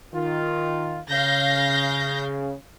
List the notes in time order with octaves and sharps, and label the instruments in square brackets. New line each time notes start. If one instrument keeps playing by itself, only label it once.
[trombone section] D#3 F4
[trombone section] C#3 [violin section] F5 G6 A#6